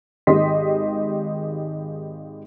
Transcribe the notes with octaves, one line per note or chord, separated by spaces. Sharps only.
G#1 G#3 G4 D#5 C6 B6